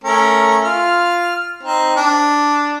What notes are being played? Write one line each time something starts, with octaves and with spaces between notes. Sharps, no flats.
A3 C#4 A#4
F4 F6
C4 D#4
D4